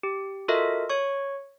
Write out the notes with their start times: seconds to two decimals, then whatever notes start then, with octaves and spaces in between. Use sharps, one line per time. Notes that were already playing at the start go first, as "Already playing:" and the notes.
0.03 G4
0.48 F4 F#4 A4 A#4 D#5 E5
0.89 C#5 C#6